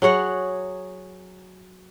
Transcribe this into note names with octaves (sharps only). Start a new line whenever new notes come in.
F#3 G#4 C#5 F#5